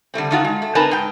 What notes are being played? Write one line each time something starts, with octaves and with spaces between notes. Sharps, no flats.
D3 G3 A3 C4
D#3 A3 D#4 F4 F#4
G#3
A3
C4 D#4 A#4 B4 G#5 A5
G#2 G5